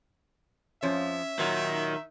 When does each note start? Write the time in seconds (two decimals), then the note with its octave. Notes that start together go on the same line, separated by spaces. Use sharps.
0.83 F2 F3 C#4 E5
1.39 A#2 D#3 F#3